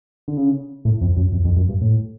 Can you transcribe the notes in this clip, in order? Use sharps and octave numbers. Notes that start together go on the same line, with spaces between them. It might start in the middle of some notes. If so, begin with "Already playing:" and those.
D3
C#3
A2
F2
F#2
F2
F2
F#2
G2
A2